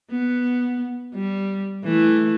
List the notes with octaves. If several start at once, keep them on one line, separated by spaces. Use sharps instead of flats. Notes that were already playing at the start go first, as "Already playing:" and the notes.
B3
G3
E3 A3